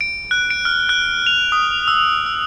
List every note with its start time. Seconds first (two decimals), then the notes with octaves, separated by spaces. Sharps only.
0.01 D7
0.31 F#6
0.50 D7
0.65 F6
0.89 F#6
1.26 F7
1.52 D#6
1.88 E6
2.26 E6